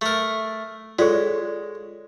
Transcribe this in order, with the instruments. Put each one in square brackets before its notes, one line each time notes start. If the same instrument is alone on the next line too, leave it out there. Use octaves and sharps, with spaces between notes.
[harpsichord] A3 A#4
[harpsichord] G#3 [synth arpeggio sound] F4 C#5 [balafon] A4 D5